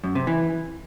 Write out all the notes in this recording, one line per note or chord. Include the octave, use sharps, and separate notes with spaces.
F#2
C3
E3